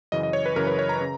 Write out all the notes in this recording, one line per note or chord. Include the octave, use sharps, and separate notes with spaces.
F#2 C#3 E3 D#5
D#5
C#5
B4
F#2 C#3 E3 A#4
B4
C#5
A#5
C#3